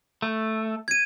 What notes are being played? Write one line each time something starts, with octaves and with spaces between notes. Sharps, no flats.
A3
G#6 D#7